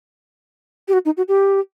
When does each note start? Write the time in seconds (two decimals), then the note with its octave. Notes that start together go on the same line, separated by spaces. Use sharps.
0.88 G4
0.93 F#4
1.05 D#4
1.17 F#4
1.28 G4